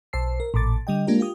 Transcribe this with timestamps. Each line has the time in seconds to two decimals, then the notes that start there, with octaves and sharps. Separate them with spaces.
0.13 B1 C5 A5 E6 C7
0.40 A#4
0.54 A1 A#2 A5 D6 A6
0.87 D3 G3 D#5 G5
1.07 G#3 A#3 D4 F4 G4 A#4
1.20 F4 G4 D#6